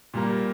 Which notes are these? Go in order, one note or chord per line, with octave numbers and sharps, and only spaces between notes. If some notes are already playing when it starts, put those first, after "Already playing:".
A#2 G3 A#3